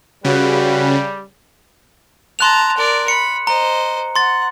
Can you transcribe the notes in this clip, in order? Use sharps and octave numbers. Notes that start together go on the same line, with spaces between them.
C#3 G3 F#4 B4
A5 A#5 C6 F#6 F7
A#4 D5
B5 C#7
C5 D#5 A#5
F#5 C6 A6